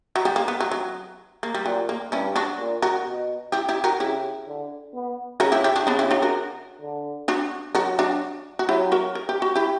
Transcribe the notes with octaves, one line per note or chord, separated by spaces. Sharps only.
F#3
G3
A#3
B3
F#3
F#3
A#3
G3
A#2 F#3
A#3
G2 C#4 E4
D4 F#4
A#2
F#4 A#4
B2
E4 G4
E4 G4
F#4 A#4
C#3 E4 G4
D3
B3
C#3 F#4 A#4
E4 G4
E4 G4
D4 F#4
C#3 B3 D4
E4 G4
D4 F#4
F#4 A#4
D3
D4 F#4
F#3 F#4 A#4
D4 F#4
F#4
F#3 E4 G4
F#4 A#4
A#4
G4
F#4
E4 G4